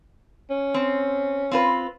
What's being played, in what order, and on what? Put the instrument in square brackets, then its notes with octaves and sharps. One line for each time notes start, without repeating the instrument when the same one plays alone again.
[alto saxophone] C#4
[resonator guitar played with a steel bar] C4
C4 F4 B4